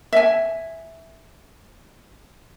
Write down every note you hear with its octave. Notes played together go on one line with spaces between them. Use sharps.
E5 G#5